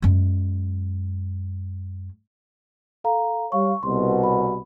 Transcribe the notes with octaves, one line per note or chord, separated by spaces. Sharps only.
F#2 G#3
A4 F5 A#5
G3 C#5 F5 C#6
C2 B2 C6
B5